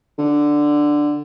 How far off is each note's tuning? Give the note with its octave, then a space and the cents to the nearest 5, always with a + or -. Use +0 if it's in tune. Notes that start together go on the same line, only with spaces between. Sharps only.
D3 +5